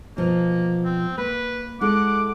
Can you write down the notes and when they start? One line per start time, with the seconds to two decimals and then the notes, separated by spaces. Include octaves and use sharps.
0.17 B2 F3 A#3 B3
0.84 C4
1.18 A#3 B4
1.81 G#3 E4 A4 F#5 D6